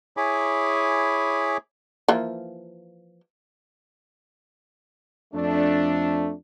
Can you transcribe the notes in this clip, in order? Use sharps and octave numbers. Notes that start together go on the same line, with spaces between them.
E4 G#4 C#5 G#5 B5 D6
E3 F3 A#3
F2 A3 D4